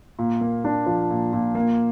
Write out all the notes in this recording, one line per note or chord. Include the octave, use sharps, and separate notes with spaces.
A#2
A#3
D4
F3
A#2
A#2
A#3